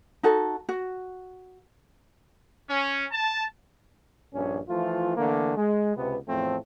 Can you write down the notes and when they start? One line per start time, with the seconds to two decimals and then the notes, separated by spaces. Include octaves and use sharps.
0.23 D#4 F#4 A4
0.69 F#4
2.69 C#4
3.12 A5
4.34 A#1 G2 C#4
4.68 E3 F3 A3 F4
5.16 D3 E3 A3 A#3
5.56 G#3
5.96 C#2 C3 B3
6.28 E2 A2 F3 A3 C4